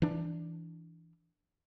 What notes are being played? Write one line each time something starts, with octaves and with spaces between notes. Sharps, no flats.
E3 D4